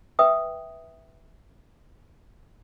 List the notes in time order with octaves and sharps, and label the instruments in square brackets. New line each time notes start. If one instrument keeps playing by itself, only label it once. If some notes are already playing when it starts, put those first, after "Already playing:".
[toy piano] B4 E5 G5 D#6